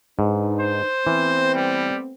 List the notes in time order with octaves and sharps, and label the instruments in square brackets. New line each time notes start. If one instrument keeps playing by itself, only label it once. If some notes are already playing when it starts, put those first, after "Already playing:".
[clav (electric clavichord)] G#2 [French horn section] D4 D#4 B4
[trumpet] C5
[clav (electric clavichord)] E3 [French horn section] A3 B3 C4
[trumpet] G3